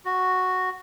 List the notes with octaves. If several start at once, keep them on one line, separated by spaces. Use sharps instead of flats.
F#4